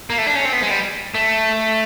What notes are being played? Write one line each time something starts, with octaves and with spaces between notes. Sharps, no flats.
A#3
A3
D4
C#4
C4
B3
G#3
G3
A3